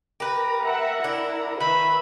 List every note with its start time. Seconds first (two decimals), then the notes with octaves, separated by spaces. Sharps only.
0.20 G4 A#4 B4 A#5
0.64 E5 F#5
1.04 D4 E4
1.60 D#3 B4 E5 B5